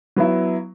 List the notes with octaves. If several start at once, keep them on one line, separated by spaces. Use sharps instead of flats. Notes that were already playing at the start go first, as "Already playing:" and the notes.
F#3 B3 E4